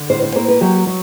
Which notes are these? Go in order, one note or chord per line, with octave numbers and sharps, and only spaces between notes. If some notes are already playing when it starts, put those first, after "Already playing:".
Already playing: D3
A2 C5
C5
A#3 C5
B4
F#3 G4
F#3